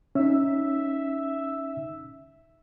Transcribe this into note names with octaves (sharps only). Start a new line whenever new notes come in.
C#4 D#4 E5